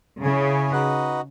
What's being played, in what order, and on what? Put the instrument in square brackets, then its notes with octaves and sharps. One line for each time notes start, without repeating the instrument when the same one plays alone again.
[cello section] C#3 [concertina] E4 G#4 C#5 G#5
[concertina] D#4 F#4 B4 D#5 F#5